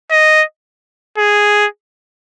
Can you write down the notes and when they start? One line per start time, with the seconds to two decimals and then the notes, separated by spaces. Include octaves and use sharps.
0.11 D#5
1.18 G#4